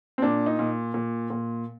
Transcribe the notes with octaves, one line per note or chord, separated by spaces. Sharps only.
C4
A#2 D4
D#4
A#2
A#2
A#2